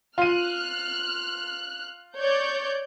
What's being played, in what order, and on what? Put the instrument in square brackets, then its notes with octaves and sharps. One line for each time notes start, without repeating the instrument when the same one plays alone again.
[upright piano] F4 D#7 [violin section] F6 F#6
[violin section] C#5 D5 G6